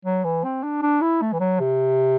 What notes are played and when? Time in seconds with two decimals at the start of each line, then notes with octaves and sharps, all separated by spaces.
0.05 F#3
0.24 E3
0.44 C4
0.63 D4
0.82 D4
1.01 E4
1.22 A3
1.33 E3
1.40 F#3
1.60 C3